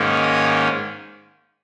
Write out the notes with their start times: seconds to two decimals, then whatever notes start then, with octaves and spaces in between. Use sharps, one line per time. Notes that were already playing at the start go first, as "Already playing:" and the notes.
Already playing: G#2 D#3 A#3 C#4
0.23 D#6